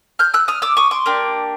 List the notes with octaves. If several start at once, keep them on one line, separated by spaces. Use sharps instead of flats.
F6 G6
E6 F#6
D#6 F6
D6 E6
C#6 D#6
C6 D6
A#3 D4 G4